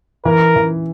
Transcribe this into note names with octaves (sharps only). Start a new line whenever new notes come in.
E3 A#4
E3